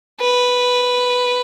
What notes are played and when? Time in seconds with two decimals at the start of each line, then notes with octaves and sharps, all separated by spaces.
0.21 B4